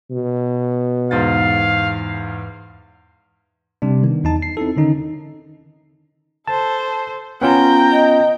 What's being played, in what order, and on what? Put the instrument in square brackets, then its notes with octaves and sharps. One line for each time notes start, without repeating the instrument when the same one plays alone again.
[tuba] B2
[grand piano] E2 G#2 A6 [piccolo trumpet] F5
[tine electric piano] C3 G3 D4
D#3 B3
E2 D#4 A5
C7
C4 D#4 E4 A4
D3 D#3 C#4 D#4
[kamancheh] A4 C5 [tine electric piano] A5
[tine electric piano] B3 C#4 F4 [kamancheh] G5 A#5
[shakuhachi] D#5